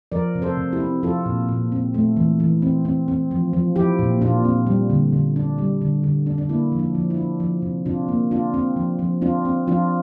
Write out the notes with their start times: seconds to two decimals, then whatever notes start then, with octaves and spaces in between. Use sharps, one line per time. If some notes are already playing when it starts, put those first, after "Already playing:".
0.12 F3 A#4 D5
0.35 C3
0.42 A4 C5
0.57 C3
0.72 E4 G4
0.80 C4
1.03 F3 F4 A4
1.26 A#2
1.49 A#2
1.72 C4
1.94 A3
2.17 E3
2.40 E3
2.62 C4
2.85 C4
3.08 C4
3.31 F3
3.53 F3
3.76 F3 E4 G4
3.99 A#2
4.21 A#2 D4 F4
4.45 C4
4.67 G3
4.90 D3
5.13 D3
5.36 D4
5.58 G3
5.82 D3
6.03 D3
6.26 D4
6.38 D4
6.49 A#3 E4
6.72 F3
6.79 D4
6.95 F3
7.10 E4
7.17 D4
7.40 F3
7.62 C3
7.86 C3 D4 F4
8.08 A#3
8.31 C4 D4 F4
8.54 C4
8.76 F3
8.99 F3
9.22 C4 D4 F4
9.45 C4
9.67 F3 D4 F4